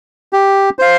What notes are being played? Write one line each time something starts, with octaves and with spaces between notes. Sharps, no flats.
G4
C5 F5